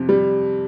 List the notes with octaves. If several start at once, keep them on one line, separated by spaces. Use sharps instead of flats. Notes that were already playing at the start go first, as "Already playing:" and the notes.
Already playing: F2 C3
G3